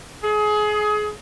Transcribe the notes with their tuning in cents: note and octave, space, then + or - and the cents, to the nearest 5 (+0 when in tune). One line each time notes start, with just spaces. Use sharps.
G#4 +25